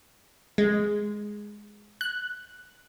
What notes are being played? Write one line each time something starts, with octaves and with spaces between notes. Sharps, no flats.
G#3
F#6